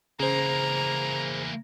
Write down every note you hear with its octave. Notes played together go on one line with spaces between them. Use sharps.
C#3 E3 A#3 G#4 C5 A#5